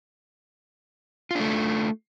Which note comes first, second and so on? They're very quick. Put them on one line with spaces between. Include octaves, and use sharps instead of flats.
F4 D4 A3